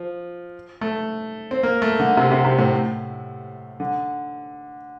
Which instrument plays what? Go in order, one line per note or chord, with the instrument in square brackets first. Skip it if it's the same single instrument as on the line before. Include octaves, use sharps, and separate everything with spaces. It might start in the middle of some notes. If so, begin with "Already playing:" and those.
Already playing: [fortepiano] F3
A3
C4
A#3
A3
D3
C3
C3
C3
A2
D3